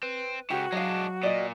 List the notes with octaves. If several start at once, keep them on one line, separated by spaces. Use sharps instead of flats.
C4 B4
C#2 C#3 F#4 G4
F#3 G#3 D4 D#5 F5
A#2 D5 D#5